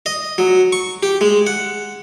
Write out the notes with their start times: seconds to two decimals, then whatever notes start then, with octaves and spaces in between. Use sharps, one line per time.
0.06 D#5
0.38 F#3
0.72 C#6
1.03 G4
1.21 G#3
1.47 F#5